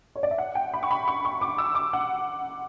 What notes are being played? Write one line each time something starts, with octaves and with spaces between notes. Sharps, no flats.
C#5
D5
E5
F#5
G5
B5
C#6
B5
C#6
C#6
D6
E6
D6
F#5